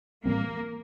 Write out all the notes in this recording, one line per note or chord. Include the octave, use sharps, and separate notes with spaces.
A2 E3 G3 A#3 C4